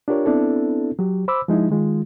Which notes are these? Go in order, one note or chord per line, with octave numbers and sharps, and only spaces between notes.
D4 F4 G4 A#4 C#5
B3 C4 D4 E4 A4
F#3 G4
C5 B5 D6 E6
F3 G#3 D#4 E4
D#3 G#3 F4